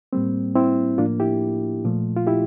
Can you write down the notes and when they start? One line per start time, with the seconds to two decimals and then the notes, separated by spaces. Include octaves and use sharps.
0.13 A2 G3 A#3 C4
0.55 C4 E4
0.98 A2 F3 A#3 D4 F4
1.20 E4 G4
1.85 A#2 F3 A3
2.17 F4
2.27 E4 G4